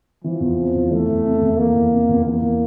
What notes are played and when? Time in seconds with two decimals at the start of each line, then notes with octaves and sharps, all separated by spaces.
0.24 E3 F3
0.41 E2
0.58 C3
0.75 E2
0.91 E3 A3
1.08 E2
1.25 C3
1.41 E2
1.58 E3 A#3
1.75 E2
1.92 C3
2.09 E2
2.25 E3 A#3
2.42 E2